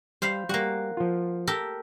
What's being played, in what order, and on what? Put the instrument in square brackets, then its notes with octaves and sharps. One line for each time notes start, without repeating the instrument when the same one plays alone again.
[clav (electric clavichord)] G3 [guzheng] C5 F5 B5
[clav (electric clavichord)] G3 [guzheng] A#3 F#4
[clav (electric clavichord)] F3 F4
[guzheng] G4 A4 A#4